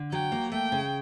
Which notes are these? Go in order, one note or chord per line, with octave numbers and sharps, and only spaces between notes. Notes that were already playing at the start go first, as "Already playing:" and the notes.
Already playing: D3
F#3 G5
A#3
A3 G5
C#3